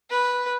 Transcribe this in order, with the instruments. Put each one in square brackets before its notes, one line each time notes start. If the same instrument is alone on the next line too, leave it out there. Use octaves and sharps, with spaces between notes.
[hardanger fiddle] B4